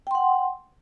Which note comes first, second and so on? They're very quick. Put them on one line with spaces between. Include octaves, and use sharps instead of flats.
G5 C6 F#5